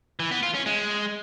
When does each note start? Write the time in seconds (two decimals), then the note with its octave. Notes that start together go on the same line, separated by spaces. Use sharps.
0.20 E3
0.31 B3
0.43 F4
0.54 C#4
0.66 G#3